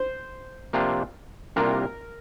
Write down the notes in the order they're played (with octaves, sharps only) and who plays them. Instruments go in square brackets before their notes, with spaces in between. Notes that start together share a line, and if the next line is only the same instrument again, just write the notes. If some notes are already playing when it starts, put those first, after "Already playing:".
Already playing: [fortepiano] C5
[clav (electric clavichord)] C3 F3 A#3 D4 F4
[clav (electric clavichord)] C2 C3 A#3 D4 F4 [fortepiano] A#4